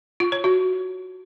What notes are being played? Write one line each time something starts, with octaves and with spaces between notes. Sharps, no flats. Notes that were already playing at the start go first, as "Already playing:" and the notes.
F4
C#5
F#4